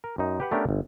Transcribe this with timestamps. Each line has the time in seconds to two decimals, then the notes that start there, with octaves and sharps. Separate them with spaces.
0.04 A#4
0.18 F#2 D#4
0.40 G4 B4 F#5
0.51 A3 B3 C#4 D4 G4 A#4
0.69 G1